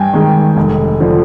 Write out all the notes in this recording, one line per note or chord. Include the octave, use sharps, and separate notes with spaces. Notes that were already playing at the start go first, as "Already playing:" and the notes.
Already playing: G2 G5 G#5
D#3 G#3
F1
D3 F3